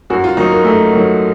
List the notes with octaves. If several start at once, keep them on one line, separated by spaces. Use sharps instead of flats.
F#2 F#4
F4
D#3 F#3 D#4
A#3
F#2 A3
D#3 F#3